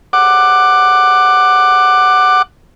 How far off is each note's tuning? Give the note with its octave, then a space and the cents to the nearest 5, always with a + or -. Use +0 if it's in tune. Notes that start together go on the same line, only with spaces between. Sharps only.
F#5 +10 D6 +15